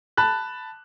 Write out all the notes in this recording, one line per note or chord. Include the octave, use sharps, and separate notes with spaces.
A5 B5 F#6